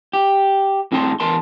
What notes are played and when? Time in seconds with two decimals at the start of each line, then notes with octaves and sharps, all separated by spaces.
0.13 G4
0.92 A2 C4 G#4 A5 C6
1.20 E2 A#4 A5 C6